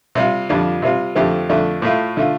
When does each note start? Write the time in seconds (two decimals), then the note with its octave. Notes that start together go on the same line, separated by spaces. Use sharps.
0.15 C3 G3 F4
0.49 F2 D3 G3 D4 F4
0.82 C3 G3 C4 F4
1.15 F2 D3 A3 C4 G4
1.49 F2 D3 A3 D4
1.82 A2 A3 F4
2.17 D3 A3 F4